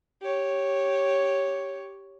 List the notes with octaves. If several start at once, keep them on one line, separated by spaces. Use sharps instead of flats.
G4 C#5